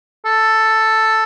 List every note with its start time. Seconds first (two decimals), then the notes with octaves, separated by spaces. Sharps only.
0.25 A4